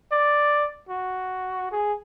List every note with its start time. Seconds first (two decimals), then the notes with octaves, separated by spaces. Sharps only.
0.12 D5
0.89 F#4
1.71 G#4